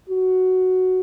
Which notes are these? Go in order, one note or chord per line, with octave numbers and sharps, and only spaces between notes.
F#4